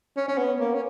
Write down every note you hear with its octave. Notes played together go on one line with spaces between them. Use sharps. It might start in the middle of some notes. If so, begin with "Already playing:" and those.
C#4
C#4
B3
A#3
C#4